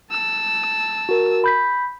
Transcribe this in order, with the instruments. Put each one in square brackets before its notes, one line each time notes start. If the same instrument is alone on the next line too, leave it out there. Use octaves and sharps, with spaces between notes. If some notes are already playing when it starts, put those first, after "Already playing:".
[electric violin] A5 E6
[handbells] F#4 A#4
B5 G6 B6